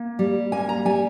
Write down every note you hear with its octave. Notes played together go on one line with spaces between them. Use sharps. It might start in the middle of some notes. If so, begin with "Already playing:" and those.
Already playing: A#3
G3
A#3 G#5
A#5
G3 G#5